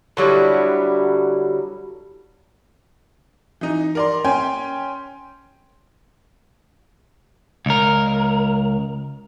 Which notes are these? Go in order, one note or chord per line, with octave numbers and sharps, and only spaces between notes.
D3 F#3 G3 E4
E3 D#4
A#4 D5 C6
C#4 G5 G#5 C6
C#2 A#4